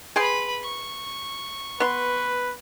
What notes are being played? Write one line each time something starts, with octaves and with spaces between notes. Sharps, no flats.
G#4 B4 G5 B5 C6
C#6
B3 B4 C6